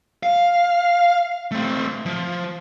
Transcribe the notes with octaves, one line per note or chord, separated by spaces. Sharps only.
F5
A3 C4
F3